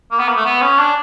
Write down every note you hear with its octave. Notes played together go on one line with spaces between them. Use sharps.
A#3
B3
A#3
A3
B3
C#4
D4